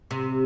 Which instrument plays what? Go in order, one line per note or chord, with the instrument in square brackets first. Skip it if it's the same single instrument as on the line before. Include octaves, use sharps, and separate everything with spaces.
[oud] C3